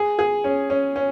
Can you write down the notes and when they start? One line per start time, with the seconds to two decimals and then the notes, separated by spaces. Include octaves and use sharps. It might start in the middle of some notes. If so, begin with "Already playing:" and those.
Already playing: G#4
0.19 G#4
0.44 C#4
0.70 C#4
0.96 C#4